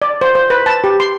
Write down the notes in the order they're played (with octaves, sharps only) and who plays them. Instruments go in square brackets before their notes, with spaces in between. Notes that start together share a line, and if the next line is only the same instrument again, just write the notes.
[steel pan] D5
C5
C5
B4
A5
G4
C6